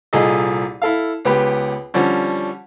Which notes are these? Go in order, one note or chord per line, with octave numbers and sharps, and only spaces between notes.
C2 A#2 G#4 A4 D#5
E4 A4 F5
C#2 B3 G4 B4
D3 F3 G3 C#4